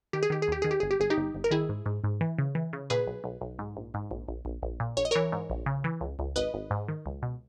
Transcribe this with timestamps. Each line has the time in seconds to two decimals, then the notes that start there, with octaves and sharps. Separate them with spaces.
0.13 D#3 G4
0.23 G#4
0.30 D#3 G4
0.42 G#4
0.48 D#2 G4
0.62 D#3 G#4
0.71 G4
0.80 G1 G#4
0.91 G4
1.00 G1 G#4
1.10 D#4 G4
1.17 G1
1.35 G1
1.44 A#4
1.51 D#3 E4 G#4
1.69 G#2
1.86 G#2
2.04 G#2
2.21 E3
2.38 C#3
2.55 E3
2.73 C#3
2.90 A#2 G#4 B4
3.07 B1
3.24 B1
3.41 B1
3.59 G#2
3.77 A#1
3.94 G#2
4.11 A#1
4.28 A#1
4.45 A#1
4.63 A#1
4.80 A#2
4.97 A#1 C#5
5.05 D#5
5.11 E3 A#4 C#5
5.32 G#2
5.50 A#1
5.66 C#3
5.84 E3
6.01 C#2
6.19 C#2
6.36 G#1 B4 D#5
6.54 G#1
6.71 G#2
6.88 D#3
7.06 C#2
7.22 B2